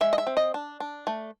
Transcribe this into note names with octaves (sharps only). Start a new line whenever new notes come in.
G#3 E5
D#5
E5
C4
D#5
D4
D4
A3